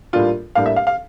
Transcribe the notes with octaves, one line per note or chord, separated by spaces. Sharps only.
A2 G3 A#3 D4 F4
A2 G3 A#3 D4 F5
E5
F5
F5